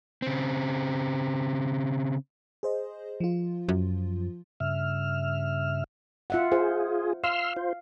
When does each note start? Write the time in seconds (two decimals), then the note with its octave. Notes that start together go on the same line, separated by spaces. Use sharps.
0.22 C#3 C4
2.63 G#4 C5 D#5
3.20 F3 F4
3.69 F#2
4.60 G2 C#3 E5 F6
6.30 F4 E5 F#5
6.52 F4 G#4 C5
7.24 F5 C6 E6 F6
7.57 F4 C5